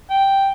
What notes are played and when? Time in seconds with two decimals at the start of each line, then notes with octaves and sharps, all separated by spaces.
0.10 G5